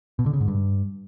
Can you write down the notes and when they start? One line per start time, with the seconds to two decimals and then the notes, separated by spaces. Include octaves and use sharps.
0.19 B2
0.26 D3
0.33 C#3
0.41 G#2
0.48 G2